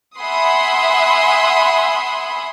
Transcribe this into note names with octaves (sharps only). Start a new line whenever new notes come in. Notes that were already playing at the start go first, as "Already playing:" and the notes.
E5 F#5 G#5 B5 C6 D#6